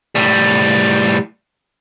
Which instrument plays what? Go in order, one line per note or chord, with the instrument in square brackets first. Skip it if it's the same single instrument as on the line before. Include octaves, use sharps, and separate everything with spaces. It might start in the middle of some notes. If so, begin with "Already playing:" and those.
[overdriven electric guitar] A2 G3